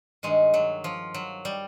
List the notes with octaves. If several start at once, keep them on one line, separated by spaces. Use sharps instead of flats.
G2 D#3 G#3
F#3
F3
F#3
G3